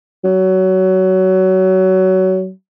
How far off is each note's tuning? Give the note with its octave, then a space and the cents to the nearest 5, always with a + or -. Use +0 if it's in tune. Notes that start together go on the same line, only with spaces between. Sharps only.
F#3 +20